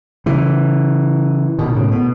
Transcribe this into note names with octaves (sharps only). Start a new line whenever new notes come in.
C#3 E3
B2 D#3
A2 C#3
B2